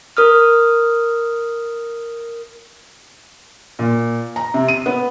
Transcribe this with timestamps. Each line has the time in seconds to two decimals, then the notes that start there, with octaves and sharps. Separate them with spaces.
0.17 A#4 D#6 F6
3.79 A#2
4.36 A#5
4.54 C3
4.68 D#7
4.86 B3